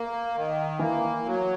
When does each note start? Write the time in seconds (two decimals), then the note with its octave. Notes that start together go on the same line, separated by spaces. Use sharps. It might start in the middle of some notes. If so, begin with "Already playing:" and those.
Already playing: A#3
0.35 D#3
0.79 E3 A#3
1.25 F#3